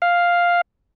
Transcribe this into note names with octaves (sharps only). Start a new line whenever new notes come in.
F5